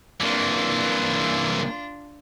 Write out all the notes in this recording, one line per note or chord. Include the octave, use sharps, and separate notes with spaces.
C2 F#2 E3 A#3 D4 F4